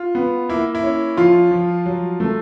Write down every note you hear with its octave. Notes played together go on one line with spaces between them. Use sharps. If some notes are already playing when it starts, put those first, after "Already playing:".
Already playing: F4
B3
A#3 E4
E4
C#4
F3 F4
F3
F#3
A3